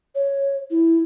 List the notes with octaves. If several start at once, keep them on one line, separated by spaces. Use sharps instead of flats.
C#5
E4